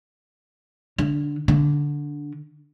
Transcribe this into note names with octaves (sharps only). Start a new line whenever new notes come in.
D3
D3